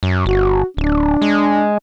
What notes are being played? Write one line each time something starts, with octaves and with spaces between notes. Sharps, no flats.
F#2
G1 F#4
D1 D4
G#3